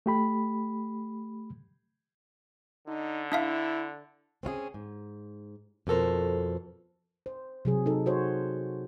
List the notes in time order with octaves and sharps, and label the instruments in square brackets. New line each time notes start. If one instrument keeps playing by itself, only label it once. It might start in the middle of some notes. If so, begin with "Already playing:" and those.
[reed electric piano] A3 G4 B5
[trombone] D3 [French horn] D#4
[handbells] D4 E5 F5 [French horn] E4
[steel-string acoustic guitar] C4 C#4 F4 G#4
G#2
F2 B2 A4 A#4 C5
[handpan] C5
C3 F#3 G#4
D#4 A4
F#4 C5 C#5